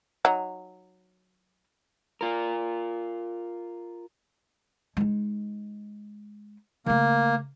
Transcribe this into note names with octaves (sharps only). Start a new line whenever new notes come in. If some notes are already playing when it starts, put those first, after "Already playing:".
F#3 D#4
F4 A#4
G#3 D#4
C#3 A3 A#3